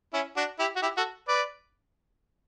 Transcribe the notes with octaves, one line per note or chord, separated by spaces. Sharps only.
C#4 E4
D4 F#4
E4 G4
F#4
E4 G4
F#4 A4
B4 D5